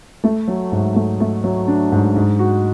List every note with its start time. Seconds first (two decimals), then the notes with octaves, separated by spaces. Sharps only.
0.24 A3
0.48 F#3
0.72 G#2
0.96 A3
1.20 A3
1.44 F#3
1.68 D4
1.92 G#2
2.16 G#2
2.39 F#4